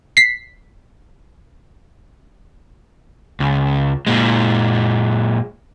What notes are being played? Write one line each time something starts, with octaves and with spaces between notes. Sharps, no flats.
B6 C7
C#2
A#2 G#3